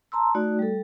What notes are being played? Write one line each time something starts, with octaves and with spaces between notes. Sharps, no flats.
A5 A#5 C6 E6
A3 D#4 F#4 D5
G3 A4